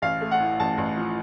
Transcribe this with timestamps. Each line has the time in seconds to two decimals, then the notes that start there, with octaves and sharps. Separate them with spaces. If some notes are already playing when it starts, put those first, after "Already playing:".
0.02 A1 F5
0.21 A3
0.31 F#5
0.40 A2
0.60 A1 A5
0.78 A1
0.97 F3